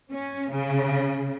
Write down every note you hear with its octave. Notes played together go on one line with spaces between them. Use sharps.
C#4
C#3